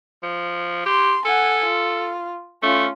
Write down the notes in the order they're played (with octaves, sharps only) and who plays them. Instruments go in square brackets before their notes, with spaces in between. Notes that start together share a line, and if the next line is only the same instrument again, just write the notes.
[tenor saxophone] F3
[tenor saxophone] G4 [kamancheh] C6
[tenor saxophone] A4 [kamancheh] F#5 G#5
[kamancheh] F4
[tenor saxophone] A3 [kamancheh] C#4 F4